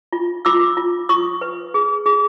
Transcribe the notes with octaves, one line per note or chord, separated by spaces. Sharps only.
F4
F4 D6 E6
F4
F4 C#6 D#6
B4
G#4
G#4